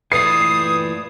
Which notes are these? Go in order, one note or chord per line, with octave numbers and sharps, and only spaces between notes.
A#2 E3 A3 B4 D5 D#6 C7